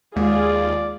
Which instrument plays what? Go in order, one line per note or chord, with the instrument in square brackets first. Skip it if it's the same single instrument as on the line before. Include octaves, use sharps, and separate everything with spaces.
[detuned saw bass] D#2 [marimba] G#3 [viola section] F4 G#4 [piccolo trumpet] D5